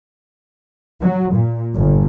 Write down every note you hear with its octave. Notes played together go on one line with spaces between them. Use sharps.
F#3
A#2
G1